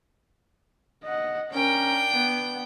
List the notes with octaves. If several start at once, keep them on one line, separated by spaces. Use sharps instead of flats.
D#5 F#5
C#4 D4 A#4 G5
B3